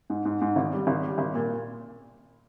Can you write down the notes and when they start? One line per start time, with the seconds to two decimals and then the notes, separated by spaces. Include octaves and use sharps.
0.10 G#2
0.25 G#2
0.41 G#2
0.56 G#1
0.73 G3
0.87 G#1
1.04 G3
1.18 G#1
1.35 A#2